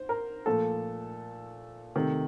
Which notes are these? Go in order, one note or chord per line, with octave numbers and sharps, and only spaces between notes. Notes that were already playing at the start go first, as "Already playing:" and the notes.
Already playing: C5
A#4
A#2 F3 A3 A4
C3 D#3 A3